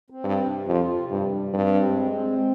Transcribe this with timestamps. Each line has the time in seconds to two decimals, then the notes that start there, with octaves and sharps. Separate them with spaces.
0.10 C4
0.24 G2
0.38 C3
0.67 F2 F4
0.96 C3
1.10 G2
1.25 G3
1.53 G2 C4
1.82 G#3
2.11 C4